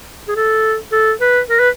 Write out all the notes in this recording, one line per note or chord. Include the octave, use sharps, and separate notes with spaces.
G#4
A4
A4
B4
A#4
B4